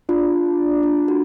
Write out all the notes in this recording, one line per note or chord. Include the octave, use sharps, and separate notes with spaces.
D4 F4
F4
F#4